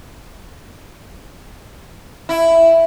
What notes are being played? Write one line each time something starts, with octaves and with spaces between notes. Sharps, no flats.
E4